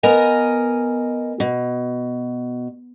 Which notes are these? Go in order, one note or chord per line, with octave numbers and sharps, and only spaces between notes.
B3 A#4 D#5 G#5
B2